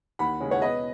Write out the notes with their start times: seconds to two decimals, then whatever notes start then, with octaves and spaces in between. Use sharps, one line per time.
0.19 D#2 F#5 B5
0.40 C#3 G#3 C#4
0.51 C#5 F#5
0.62 B2 B4 D#5